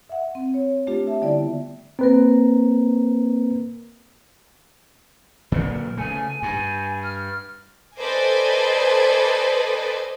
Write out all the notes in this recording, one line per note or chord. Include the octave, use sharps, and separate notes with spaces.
E5 F#5
C4
C#5
A3 D4 F4 G4
E5 A5
D3 G3 B3 E4 D5
A#3 C4 A#4 B4
A#2 D3 F#3 A#4
C#3 A3 G#5
G2 G#5
F6
A4 B4 C5 D5 D#5 G#5